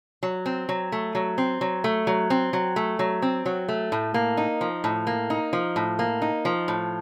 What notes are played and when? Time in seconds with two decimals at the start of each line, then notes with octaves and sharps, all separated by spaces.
0.23 F#3
0.46 C4
0.69 F#3
0.92 A3
1.15 F#3
1.38 C4
1.61 F#3
1.84 A3
2.07 F#3
2.30 C4
2.53 F#3
2.76 A3
2.99 F#3
3.22 C4
3.46 F#3
3.69 A3
3.92 A2
4.14 A#3
4.37 D#4
4.61 F3
4.84 A2
5.07 A#3
5.30 D#4
5.53 F3
5.76 A2
5.99 A#3
6.22 D#4
6.45 F3
6.68 A2